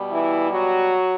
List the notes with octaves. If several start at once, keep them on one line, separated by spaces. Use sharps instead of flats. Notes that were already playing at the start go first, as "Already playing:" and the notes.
Already playing: B2 G3
E3 E4
F#3 F#4